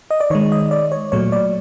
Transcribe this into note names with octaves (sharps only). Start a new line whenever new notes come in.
D#5
D5
D#3 G#3 C#5
D#5
D5
C#5
A#2 F#3 A3 C#5
D5